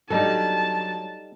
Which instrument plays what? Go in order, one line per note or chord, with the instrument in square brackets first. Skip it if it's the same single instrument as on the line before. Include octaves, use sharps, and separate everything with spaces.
[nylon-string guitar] F#3 D4 [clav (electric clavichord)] G3 D#4 A4 [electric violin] A5